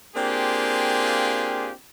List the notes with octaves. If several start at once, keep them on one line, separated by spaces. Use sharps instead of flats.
A#3 C4 D4 F4 G4 G#4